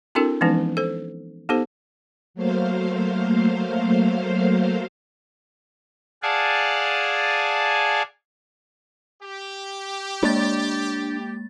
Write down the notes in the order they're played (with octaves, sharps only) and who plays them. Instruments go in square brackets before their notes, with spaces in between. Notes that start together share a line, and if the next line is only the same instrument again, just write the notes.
[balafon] C4 D4 E4 F#4 A4 A#4
E3 F3 G#3 B3 C#4 D#4
A4 C5
B3 D#4 G4 A4 C5
[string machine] F#3 A3 A#3 C5 F5
[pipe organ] G#4 D5 F5 F#5 G#5 A5
[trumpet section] G4
[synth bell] G#3 A#3 A6 [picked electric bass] D4